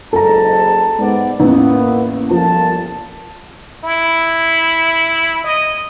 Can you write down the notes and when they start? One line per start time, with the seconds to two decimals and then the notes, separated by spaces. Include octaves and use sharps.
0.13 F#1 G#2 A4 A5 A#5
0.98 G#2 B3 D5
1.40 A1 E2 A#3 B3
2.31 G1 A#2 F3 A5
3.84 E4
5.44 D#5